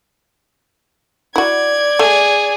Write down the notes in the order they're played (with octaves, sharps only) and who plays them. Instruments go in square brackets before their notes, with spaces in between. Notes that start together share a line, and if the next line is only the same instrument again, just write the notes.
[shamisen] E4 F#4 [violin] D5 G#6
[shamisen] A3 [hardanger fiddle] G#4